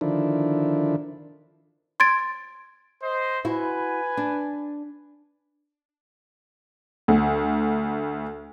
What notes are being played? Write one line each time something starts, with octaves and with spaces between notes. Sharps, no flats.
D3 D#3 F3 D4 E4
C6 G#6 A6 D7
C5 D#5
E4 F#4 B4 G#5
D4
D2